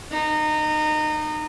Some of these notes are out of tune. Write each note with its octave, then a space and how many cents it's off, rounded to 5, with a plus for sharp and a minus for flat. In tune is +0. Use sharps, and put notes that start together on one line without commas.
D#4 -25